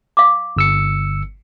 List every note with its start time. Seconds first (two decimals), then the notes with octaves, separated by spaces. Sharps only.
0.17 F5 D6
0.57 G1 E6 C#7